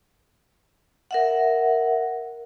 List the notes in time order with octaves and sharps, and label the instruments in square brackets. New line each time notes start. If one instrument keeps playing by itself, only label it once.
[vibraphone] A#4 E5 F#5